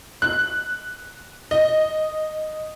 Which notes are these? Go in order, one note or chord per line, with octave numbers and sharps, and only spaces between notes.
F#6
D#5